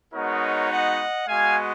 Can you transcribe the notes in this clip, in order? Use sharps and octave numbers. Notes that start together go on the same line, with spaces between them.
G#3 B3 D#4 F#4 A#4 C#5
D#5 F#5
G#3 B3 F#4 F5 G#5